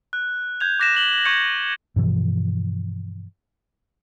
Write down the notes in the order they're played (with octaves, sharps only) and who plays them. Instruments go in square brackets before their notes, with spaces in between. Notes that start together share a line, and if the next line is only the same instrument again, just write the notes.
[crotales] F#6
G6 G#6 F7
D6 F#6 A#6 B6 E7
E7 F#7 G7
C#6 G6 G#6 C#7 F7 F#7
[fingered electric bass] G2 B2 E3 F3